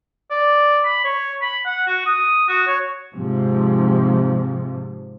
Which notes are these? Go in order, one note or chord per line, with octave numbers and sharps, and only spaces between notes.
D5
B5
C#5
B5
F#5
F#4
D#6
F#4
C#5
G#2 C3 F3